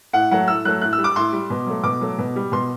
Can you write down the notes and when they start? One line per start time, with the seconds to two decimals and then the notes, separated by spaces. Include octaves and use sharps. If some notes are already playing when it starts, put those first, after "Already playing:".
0.13 A2 F#5
0.31 F#3 A3 F#5
0.48 A2 E6
0.65 F#3 A3 F#6
0.81 A2 F#6
0.93 E6
0.98 G3
1.04 D6
1.16 A2 C6
1.32 G3
1.50 B2
1.67 F#3 A3
1.84 B2 D6
2.01 F#3 A3
2.18 B2
2.36 G3
2.52 B2 C6